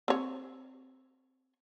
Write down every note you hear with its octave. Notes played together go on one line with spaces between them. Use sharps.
C4 C#5